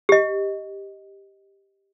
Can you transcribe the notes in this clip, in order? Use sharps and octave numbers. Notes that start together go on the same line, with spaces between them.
G4 D#5